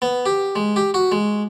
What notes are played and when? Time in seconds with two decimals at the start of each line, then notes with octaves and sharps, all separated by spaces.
0.02 B3
0.26 G4
0.56 G#3
0.76 G4
0.94 F#4
1.12 G#3